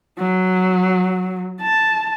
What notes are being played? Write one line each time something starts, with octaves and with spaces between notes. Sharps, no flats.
F#3
A5